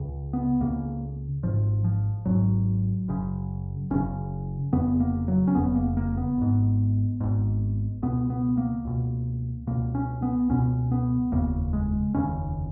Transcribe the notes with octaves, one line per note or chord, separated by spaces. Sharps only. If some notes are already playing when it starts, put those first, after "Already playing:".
Already playing: C#2 C#3
B3
C#2 C#3 A#3
G#1 G#2 F3
F3
G#1 G#2 F#3
F#1 F#2 C#3
F#1 F#2 C#3 C#4
F1 F2 C#3 B3
A#3
F#3
C#4
F1 F2 C#3 B3
A#3
A#3
B3
G#1 G#2
G#1 G#2
C#2 B2 B3
B3
A#3
C#2 B2
C#2 B2 A#3
C#4
B3
C#2 B2 C#4
B3
F1 D#2 C#3 A#3
G#3
F1 D#2 C#3 C#4